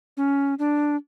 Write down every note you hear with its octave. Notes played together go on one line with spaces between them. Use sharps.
C#4
D4